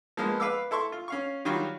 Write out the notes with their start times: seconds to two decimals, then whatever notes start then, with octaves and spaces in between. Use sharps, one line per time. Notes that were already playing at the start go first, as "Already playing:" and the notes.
0.17 F3 G#3 A#3 B3
0.40 B4 F5 D6 E6
0.71 E4 A4 C6 C#6
0.92 F4
1.08 C#4 F5 C#6
1.45 D#3 F#3 G3 F4 F#4